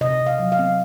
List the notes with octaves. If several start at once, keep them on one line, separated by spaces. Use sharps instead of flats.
C3 D#5
C3
F5
F#3
F5
C4